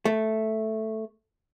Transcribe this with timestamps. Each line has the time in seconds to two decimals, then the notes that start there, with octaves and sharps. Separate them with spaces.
0.05 A3